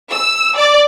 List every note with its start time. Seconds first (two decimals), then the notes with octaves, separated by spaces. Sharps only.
0.10 E6
0.56 D5